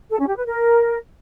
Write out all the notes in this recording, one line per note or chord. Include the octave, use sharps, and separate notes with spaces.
A4
C#4
G4
B4
A#4